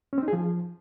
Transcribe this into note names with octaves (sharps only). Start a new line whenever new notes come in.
C#4
C4
D#4
G#4
F3